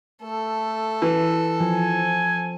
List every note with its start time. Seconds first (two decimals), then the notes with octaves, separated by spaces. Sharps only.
0.23 A3 A4
1.02 E3
1.60 F3 G#5